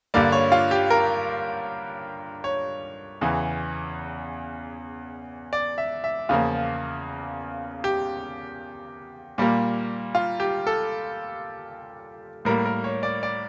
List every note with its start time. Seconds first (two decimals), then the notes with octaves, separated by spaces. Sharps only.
0.14 G2 D3 G3 A#3 D5
0.32 C#5
0.52 F4
0.71 G4
0.90 A#4
2.44 C#5
3.21 E2 C#3 E3
5.53 D5
5.78 E5
6.04 E5
6.29 E2 C#3 F3 A#3 F4
7.84 G4
9.38 A#2 G3 A#3
10.15 F4
10.40 G4
10.67 A4
12.45 A2 G3 A#3 A#4
12.66 A#4
12.84 C#5
13.03 D5
13.23 D5